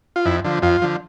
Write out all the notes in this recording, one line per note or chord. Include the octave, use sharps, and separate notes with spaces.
F4
F2 E4
D3 F3
F2 F4
D3 F3